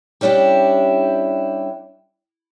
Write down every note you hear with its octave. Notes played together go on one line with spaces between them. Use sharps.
G3 C#4 D4 E4 G4